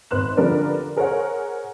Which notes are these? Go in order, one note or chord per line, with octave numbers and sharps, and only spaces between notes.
G#1 B4 C6 F#6 E7
D3 F3 G4 A#4 B4 D5
G#4 A#4 C5 C#5 F#5